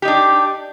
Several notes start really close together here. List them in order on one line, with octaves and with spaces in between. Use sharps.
G4 D#4 D4